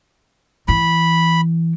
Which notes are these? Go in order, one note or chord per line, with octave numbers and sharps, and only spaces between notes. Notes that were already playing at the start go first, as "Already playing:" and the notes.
E3 B5